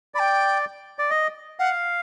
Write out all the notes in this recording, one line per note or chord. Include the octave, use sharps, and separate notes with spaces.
D5 G5 B5
D5
D#5
F5 F#5